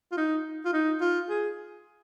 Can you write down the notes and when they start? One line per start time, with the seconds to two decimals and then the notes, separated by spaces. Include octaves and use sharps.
0.12 F4
0.17 D#4
0.65 F4
0.73 D#4
1.01 F4
1.29 G#4